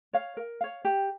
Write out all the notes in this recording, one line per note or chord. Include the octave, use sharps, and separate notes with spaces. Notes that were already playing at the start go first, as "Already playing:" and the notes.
C#5 F5
A#4
C#5 F5
G4